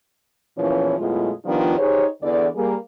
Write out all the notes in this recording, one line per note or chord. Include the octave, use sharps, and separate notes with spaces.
E2 A#2 E3 F3 C#4 C#5
F#2 B2 G#3 A3 E4 F4
D#3 F3 G3 B3 D4 F4
D#4 G4 G#4 C5 C#5
E2 D3 D5
G3 A#3 G#4